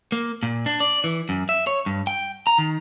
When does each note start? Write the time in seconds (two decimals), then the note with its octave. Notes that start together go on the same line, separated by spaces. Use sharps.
0.12 A#3
0.43 A#2
0.66 D4
0.80 D5
1.04 E3
1.29 F#2
1.49 E5
1.67 C#5
1.86 G2
2.07 G5
2.47 A#5
2.58 D#3